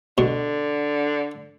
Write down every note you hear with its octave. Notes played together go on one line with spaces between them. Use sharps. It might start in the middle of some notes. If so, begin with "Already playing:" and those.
B2 D3